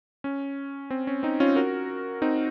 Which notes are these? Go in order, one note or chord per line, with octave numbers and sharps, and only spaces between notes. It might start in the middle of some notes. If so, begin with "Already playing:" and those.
C#4
C4
C#4
C4 D#4
C#4 F4
F#4 A#4
C4 D#4